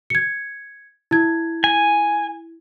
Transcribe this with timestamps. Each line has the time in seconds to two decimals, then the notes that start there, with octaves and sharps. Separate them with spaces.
0.10 G#6 C#7
1.11 E4 G#6
1.64 G#5